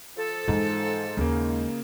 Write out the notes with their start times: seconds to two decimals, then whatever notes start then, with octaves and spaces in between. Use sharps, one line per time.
0.17 F3 A4
0.48 G#2 E3
1.17 D#2 C#3 A#3